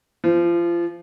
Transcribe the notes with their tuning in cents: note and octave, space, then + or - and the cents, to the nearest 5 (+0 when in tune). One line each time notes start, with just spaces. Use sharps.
F3 -30